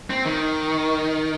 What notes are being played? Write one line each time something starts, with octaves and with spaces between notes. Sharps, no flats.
C4
D#3